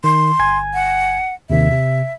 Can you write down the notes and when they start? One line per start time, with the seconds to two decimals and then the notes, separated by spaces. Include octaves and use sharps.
0.04 D#3 C6
0.39 G1 G#5 G#6
0.74 F#5
1.50 D#2 C3 D#3 E5
1.71 C3